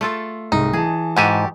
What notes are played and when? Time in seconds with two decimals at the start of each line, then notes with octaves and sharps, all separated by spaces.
0.01 A3 F4 A4
0.52 C2 G#2 D#4
0.73 E3 G#4 A5
1.16 G#2 F#4 G4 A4 G#5